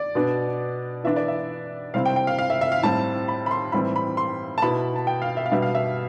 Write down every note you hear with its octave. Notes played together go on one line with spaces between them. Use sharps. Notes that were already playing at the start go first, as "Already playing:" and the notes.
Already playing: D5
B2 B3 D4
E3 B3 D4 E5
D5
E5
C3 G3 C4 E4 F5
G5
G5
F5
F5
E5
E5
F5
A2 G3 C4 A5
B5
B5
C6
A2 E3 G3 C4 E4 B5
B5
C6
A5
B2 B3 E4 B5
A5
G5
F5
E5
F5
B2 G3 B3 D4 E5
F5
E5